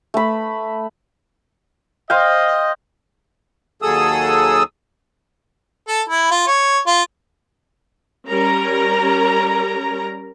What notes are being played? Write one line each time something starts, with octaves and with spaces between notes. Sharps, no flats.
A3 B5
C5 D#5 F5 G5
D#2 F#3 G#4 A4 D#6 E6
A4
E4
F4
C#5
F4
G3 C#4 A#4 A#5